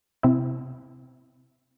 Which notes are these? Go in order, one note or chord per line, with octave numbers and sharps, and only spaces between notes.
C3 E4